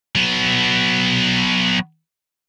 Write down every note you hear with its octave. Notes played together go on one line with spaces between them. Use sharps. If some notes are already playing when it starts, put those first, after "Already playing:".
F#3 B3